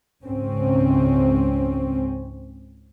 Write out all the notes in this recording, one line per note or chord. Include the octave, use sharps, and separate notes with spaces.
C#2 G#2 C4 C#4